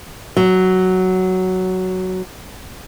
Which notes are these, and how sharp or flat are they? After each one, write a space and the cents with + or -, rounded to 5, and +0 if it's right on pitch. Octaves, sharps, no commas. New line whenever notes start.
F#3 +5